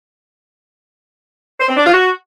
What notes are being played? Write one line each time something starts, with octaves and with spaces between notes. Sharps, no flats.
C5
C4
D4
F4
F#4